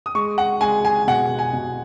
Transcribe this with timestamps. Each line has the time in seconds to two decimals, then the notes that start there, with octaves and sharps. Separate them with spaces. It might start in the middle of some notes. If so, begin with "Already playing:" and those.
0.06 D#6
0.15 G#3 C#6
0.38 F#5
0.61 G#3 G#5
0.85 G#5
1.07 B2 F#5
1.39 G#5
1.53 B2